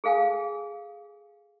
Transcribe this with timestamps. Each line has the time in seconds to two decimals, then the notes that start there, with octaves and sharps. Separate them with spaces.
0.04 G#4 A4 F5 G5 G#5